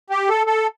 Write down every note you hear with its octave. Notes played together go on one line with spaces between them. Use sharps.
G4
A4
A4